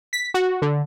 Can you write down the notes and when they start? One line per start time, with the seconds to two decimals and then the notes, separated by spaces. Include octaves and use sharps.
0.13 B6
0.34 F#4
0.62 D3